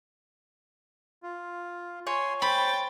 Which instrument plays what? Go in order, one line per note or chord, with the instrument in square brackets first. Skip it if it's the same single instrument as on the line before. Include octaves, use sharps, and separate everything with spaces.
[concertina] F4
[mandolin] C#5 [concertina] G#5 C6
[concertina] C5 [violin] G5 A6 [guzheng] B5